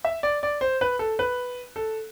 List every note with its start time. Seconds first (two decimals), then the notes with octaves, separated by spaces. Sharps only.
0.05 E5
0.23 D5
0.43 D5
0.61 C5
0.81 B4
0.99 A4
1.19 B4
1.76 A4